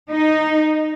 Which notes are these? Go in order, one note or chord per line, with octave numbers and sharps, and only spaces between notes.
D#4